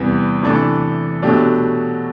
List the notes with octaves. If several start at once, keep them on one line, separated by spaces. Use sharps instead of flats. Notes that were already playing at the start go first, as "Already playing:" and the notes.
Already playing: E2 C3 G3 B3
C3 E3 A3 D4 A4
B2 F#3 A3 D4 G4